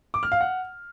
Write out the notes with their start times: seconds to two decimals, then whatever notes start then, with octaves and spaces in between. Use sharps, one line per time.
0.14 D6
0.23 F6
0.32 F5
0.41 F#5